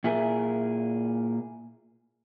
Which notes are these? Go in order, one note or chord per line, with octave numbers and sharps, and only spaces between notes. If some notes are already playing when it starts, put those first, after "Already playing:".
A#2 E4 G#4 A#4